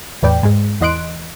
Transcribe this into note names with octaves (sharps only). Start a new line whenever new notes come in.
E2 A2 B4 D5 G5
G#2 G#3
E2 E3 D#5 C6 F#6 D7